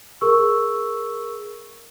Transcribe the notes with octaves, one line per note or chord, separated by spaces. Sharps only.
G#4 A#4 C#6 E6